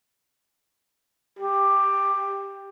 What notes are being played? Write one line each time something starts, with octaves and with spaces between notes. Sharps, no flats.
G4